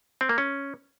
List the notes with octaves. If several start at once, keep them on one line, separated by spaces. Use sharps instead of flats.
C4
A#3
C#4